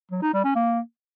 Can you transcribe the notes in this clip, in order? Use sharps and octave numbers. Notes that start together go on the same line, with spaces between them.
F#3
D#4
G3
C#4
A#3